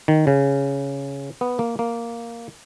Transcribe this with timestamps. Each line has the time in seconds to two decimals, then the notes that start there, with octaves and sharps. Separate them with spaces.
0.08 D#3
0.27 C#3
1.41 B3
1.59 A#3
1.79 A#3